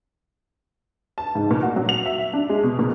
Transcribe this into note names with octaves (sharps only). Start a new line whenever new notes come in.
A5
G#2
A#2
F#4
F#3
F7
E5
D4
G#3
B2
A#2